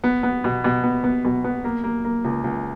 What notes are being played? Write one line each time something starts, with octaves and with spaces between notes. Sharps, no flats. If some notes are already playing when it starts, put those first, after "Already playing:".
B3
B3
B2
B2
B3
B3
B2
B3
A#3
A#3
A#3
C#2
C#2